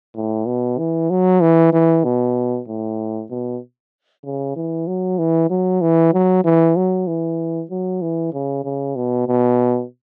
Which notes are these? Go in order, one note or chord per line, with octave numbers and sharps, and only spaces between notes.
A2
B2
E3
F#3
E3
E3
B2
A2
B2
C#3
E3
F#3
E3
F#3
E3
F#3
E3
F#3
E3
F#3
E3
C#3
C#3
B2
B2